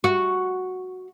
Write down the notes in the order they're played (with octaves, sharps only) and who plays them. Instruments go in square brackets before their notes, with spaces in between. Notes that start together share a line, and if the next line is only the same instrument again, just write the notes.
[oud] F#4